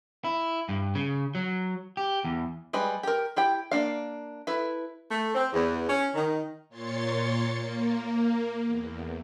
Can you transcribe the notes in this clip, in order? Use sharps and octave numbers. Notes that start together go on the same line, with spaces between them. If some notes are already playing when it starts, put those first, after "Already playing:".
E4
G2
C#3
F#3
G4
E2
G3 G#3 B4 B5
G4 A#4
E4 G4 G5
A#3 D4 F5
E4 A4 B4
A3
C4
E2
C#4
D#3
A#2 C#5 C6 A6 C#7
A#3
E2